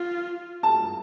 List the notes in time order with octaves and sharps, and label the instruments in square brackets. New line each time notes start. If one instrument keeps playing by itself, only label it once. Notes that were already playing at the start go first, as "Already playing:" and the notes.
Already playing: [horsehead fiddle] F4
[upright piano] A5